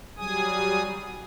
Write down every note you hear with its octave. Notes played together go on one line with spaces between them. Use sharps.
F#3 G3 G#4 G#5 D#6